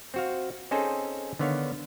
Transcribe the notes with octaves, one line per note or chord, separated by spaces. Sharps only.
C4 F#4 F5
C4 C#4 D#4 G#4 A4 C5
D3 D#3 B3 C#5 F5